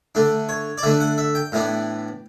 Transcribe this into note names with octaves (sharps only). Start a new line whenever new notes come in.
D3 A3 D4
C#5
D5
D3 A3 D4 E5
F#5
E5
G5
A2 E3 B3 D4